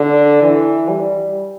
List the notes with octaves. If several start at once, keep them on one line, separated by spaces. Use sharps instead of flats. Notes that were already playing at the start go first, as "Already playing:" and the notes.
Already playing: D3
E3
G3